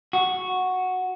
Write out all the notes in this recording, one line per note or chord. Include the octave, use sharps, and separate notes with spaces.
F#4